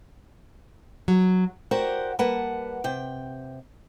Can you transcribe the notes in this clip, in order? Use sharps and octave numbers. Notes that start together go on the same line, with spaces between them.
F#3
F#4 G4 A#4 C5 D5 F#5
G3 A#3 B4 F#5 A5
C3 G5